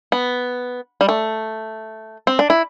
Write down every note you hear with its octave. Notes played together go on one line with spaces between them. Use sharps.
B3
G3
A3
C4
D4
E4